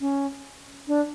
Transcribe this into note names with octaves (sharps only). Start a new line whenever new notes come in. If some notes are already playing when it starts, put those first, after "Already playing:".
C#4
D4